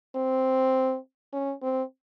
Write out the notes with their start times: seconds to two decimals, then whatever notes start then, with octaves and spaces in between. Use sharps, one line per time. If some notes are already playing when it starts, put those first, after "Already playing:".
0.15 C4
1.33 C#4
1.62 C4